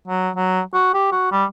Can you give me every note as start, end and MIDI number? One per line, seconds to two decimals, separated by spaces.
0.07 0.29 54
0.36 0.60 54
0.74 0.92 66
0.94 1.11 67
1.12 1.28 66
1.32 1.45 55